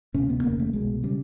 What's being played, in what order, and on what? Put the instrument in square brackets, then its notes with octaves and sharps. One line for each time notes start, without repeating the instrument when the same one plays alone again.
[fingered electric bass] D2 C3 C#4
B3
F1 D#2 C#3 A#3
A3
C2 B2 G#3
C#3 G3